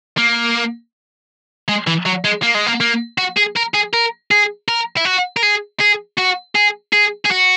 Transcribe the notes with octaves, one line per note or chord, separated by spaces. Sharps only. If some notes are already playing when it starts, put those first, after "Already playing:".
A#3
G#3
E3
F#3
G#3
A#3
G#3
A#3
A#3
F#4
G#4
A#4
G#4
A#4
G#4
A#4
E4
F#4
A#4
G#4
G#4
F#4
G#4
G#4
G#4
F#4